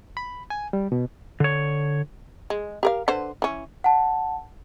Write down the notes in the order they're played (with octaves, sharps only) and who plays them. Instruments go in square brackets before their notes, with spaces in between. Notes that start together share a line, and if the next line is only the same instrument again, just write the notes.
[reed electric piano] B5
G#5
G3
B2
[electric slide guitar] D3 C#5
[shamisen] G#3
G4 A#4 F5
D3 B4 C5
E3 C#4
[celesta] F#5 A5